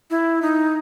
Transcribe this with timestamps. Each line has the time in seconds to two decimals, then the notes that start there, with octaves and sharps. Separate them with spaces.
0.10 E4
0.42 D#4